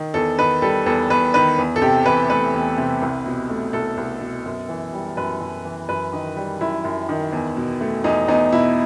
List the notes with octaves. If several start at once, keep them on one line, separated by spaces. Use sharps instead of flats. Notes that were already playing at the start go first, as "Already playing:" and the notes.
Already playing: D#3
E2 A4
D#3 B4
G3 A4
E2 A4
E2 B4
D#3 B4
E2
A4
C3 G4
E3 B4
A3 B4
E2
C3
C2
B2
A3
C2 A4
C2
B2
F#2
E3
G3
F#2 B4
F#2
E3
F#2 B4
D#3
G3
F#2 E4
F#2
D#3
E2
B2
A3
E2 D#4
E2 D#4
B2 E4